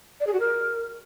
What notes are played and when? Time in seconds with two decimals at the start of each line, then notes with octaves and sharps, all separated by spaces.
0.20 D5
0.27 G#4
0.33 F#4
0.40 A#4